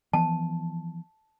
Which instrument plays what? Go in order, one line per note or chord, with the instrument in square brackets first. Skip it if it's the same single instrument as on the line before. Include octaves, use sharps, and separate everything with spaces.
[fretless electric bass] E3 F3 B3 [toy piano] A5